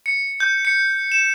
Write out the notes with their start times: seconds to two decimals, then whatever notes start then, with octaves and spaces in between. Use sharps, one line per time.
0.06 C#7
0.40 G6
0.65 C#7
1.12 E7